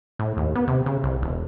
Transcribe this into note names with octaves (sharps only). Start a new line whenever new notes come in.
A2
D#2
B3
C3
C#3
C2
E1